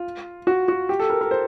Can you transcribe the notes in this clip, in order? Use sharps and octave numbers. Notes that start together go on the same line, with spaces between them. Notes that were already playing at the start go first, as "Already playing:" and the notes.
Already playing: F4
F#4
F#4
G4
A4
A#4
A#4
C5